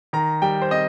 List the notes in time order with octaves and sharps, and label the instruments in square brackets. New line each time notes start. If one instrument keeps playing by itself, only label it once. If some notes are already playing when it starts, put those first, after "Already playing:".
[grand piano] D#3 A#5
G3 G5
C5
C4 D#5